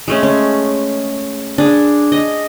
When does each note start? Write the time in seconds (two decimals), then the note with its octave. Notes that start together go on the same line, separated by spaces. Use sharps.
0.08 G#3 A3 C#4
0.23 C#4
1.58 D4 G#4
2.12 D#5